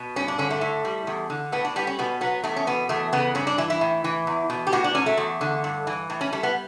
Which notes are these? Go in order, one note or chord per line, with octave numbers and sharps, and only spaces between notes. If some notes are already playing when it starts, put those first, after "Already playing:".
Already playing: B2
G2 C#4
D4
D3 C#4
A3
A2
G3
E2
D3
A2 B3
D4
G3 B3
C#4
B2 B3
F#3 B3
E2 A3
C#4
B2 B3
E2 A3
C#3 B3
G2 C#4
D4
E3 E4
E4
A2
E3
E2
B2
G4
A2 F#4
D4
F#3 C#4
A3
E2
D3
G2
E3
A2
C#4
G3 A3
B3